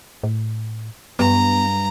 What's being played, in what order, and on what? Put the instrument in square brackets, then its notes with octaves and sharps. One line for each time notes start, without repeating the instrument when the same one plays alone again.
[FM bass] A2
[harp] G2 [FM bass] B3 [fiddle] A#5